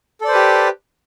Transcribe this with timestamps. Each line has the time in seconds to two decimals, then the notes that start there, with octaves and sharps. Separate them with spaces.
0.21 A4
0.24 D5
0.28 C5
0.31 B4
0.35 G4